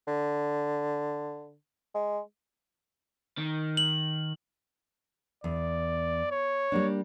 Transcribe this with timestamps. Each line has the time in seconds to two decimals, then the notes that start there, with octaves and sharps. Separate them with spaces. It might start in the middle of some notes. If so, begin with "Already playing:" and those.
0.08 D3
1.95 G#3
3.38 D#3
3.77 F#7
5.44 E2 D5
6.31 C#5
6.72 G3 A#3 D4